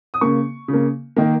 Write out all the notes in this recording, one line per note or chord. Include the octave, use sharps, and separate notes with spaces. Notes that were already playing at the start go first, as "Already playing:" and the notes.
D#6
C#3 A#3 C#6
C#3
A#3
D#3 A#3